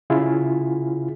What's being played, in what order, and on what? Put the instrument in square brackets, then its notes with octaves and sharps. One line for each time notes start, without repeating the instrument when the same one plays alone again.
[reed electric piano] C#3 E4 F4 G#4